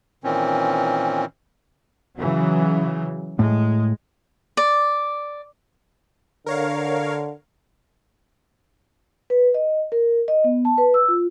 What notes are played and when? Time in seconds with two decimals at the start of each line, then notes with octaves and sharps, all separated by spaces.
0.24 A#2 D#3 E3 C4 C#4
2.18 C#3 E3 F#3
3.39 A2 G#3
4.57 D5
6.46 D3 A#4 C#5 F5
9.30 B4
9.54 D#5
9.92 A#4
10.28 D#5
10.44 B3
10.65 A5
10.78 B4
10.94 E6
11.08 F4